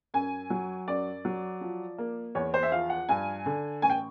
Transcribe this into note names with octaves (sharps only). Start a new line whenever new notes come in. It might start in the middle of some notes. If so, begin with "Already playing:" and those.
F#2 G#5
F#3
F#2 D5
F#3
F3
A#3
E2 C#5
C5
E5
F3 F5
F#5
G2 G#5
D3
A1 G#5
G5